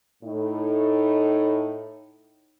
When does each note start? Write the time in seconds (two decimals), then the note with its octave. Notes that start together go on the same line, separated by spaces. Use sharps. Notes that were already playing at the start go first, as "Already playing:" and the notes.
0.23 A2 D#4